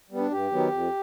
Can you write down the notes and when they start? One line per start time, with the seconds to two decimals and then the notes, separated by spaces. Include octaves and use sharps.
0.10 G3 B3
0.18 D4
0.31 G2 G4
0.51 D#3 F#3 B3
0.72 F2